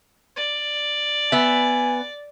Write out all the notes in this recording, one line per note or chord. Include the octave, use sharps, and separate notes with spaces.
D5
B3 E5 G#5